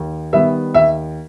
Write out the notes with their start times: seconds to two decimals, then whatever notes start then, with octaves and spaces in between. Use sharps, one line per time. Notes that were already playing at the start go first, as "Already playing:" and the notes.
Already playing: D#2
0.33 D#3 G3 B3 E5
0.74 D#2 E5